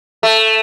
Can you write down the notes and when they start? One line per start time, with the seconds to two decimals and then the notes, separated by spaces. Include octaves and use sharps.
0.23 A3